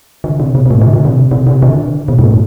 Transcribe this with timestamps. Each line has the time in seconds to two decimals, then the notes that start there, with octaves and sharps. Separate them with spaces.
0.24 D3
0.40 C3
0.55 B2
0.66 B2
0.71 A2
0.81 D3
0.94 D3
1.05 C3
1.31 C3
1.47 C3
1.62 D3
2.08 B2
2.19 G2
2.24 A2